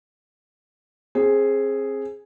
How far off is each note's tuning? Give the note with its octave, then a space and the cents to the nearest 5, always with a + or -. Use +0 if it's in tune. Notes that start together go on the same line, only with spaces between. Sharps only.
C4 +30 G#4 +0